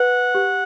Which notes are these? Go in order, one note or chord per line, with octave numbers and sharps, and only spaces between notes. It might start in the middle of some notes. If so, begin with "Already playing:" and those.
Already playing: B4 F#5
G4